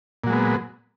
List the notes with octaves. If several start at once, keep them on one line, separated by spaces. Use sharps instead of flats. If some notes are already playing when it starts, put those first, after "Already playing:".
A#2 F#3 G#3 B3